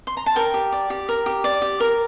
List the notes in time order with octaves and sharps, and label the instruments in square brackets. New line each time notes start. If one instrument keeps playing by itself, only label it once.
[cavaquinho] C6
A#5
A5
A#4 G5
G4
D5
G4
A#4
G4
D5
G4
A#4